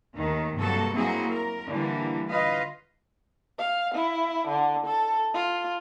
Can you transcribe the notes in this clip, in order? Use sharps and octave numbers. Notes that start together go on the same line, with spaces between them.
D#2 D#3 A3
G2 C3 F#3 A#3 F#4 A4
F#3 A#3 C4 E4 F#4 G#4
A#4
D3 E3 G3 A#3
F4 B4 D#5 F5
F5
E4
D3
A4
F4